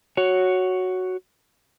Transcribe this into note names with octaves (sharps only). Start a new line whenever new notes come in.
F#4 C#5